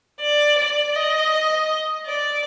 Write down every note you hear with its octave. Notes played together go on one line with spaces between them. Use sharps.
D5
D5
D#5
D5